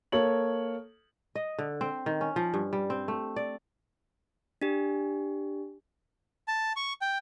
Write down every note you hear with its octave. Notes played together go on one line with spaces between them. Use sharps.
A#3 A4 C#5 F#7
D#5
D3
C4
D#3
C#4
F3
G2
G3
C4
A3
D5
D4 G4
A5
C#6
G5